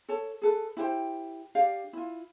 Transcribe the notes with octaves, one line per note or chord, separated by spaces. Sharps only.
A4 C#5 A5
G#4 A4 B4
E4 G4 C5 G5
D4 G4 D5 F5
E4 F4